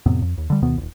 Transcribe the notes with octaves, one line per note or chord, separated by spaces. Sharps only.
F2 A2 C3 B3
F2
D#2
D3 G3
D2 B2 D#3 B3
D#1 C#2